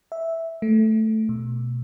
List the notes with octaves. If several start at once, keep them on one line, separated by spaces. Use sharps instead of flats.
E5
A3
B2